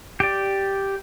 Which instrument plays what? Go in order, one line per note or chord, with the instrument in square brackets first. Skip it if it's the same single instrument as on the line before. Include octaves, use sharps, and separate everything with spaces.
[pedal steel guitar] G4 D5